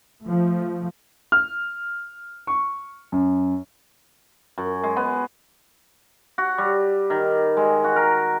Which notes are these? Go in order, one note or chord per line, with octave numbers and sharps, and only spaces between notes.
F3 A3
F6
C#6
F#2
F#2
G#3
B3
F#4
G3
D#3
G#3
F#4
A#4